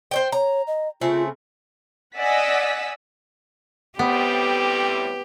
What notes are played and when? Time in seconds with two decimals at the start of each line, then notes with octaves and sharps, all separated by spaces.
0.11 C5 C#5 G5
0.32 C#5 A#5
0.67 D#5
1.01 C#3 A3 C4 F4
2.16 D5 D#5 F#5 G#5 E6 B6
3.99 A2 G3 B3 C4 G4